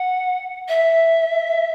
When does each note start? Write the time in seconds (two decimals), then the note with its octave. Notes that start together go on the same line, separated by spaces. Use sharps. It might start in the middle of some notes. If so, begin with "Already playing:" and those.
Already playing: F#5
0.68 E5